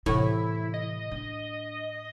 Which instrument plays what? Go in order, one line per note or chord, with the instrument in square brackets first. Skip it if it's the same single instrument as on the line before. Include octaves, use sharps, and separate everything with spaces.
[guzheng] A2 [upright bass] C3 E3 [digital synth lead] E4
[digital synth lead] D#5
[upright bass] D4